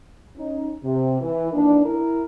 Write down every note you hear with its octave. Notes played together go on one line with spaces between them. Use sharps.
C#4 D#4
C3
E3
D#3 E3 A#3 D4
E4 A#4